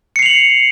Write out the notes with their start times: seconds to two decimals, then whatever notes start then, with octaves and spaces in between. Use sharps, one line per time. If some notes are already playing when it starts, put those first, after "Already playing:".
0.16 C#7
0.19 C7
0.23 F7
0.26 F#7